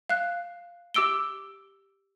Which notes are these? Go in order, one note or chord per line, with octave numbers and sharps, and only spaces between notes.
F5 F#6
G4 D6 E6 D7 G7